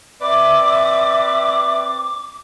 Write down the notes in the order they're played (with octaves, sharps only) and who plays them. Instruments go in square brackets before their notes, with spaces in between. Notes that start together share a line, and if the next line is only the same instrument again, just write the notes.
[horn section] C4 B4 D5 [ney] E5 [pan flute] D6